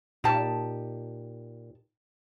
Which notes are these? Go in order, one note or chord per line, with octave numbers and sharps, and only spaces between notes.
A#2 D#4 G4 A5